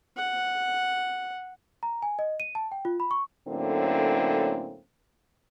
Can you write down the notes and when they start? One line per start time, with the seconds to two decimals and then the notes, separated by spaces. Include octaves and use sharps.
0.17 F#5
1.83 A#5
2.02 G#5
2.19 D#5
2.40 D#7
2.55 A5
2.72 G5
2.85 F4
3.00 B5
3.11 C#6
3.47 A2 D3 F#3 A#3 C4 C#4